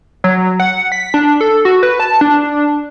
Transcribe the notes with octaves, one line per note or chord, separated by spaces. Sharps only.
F#3
F#5
B6
D4
A4
F#4
B4
A5
D4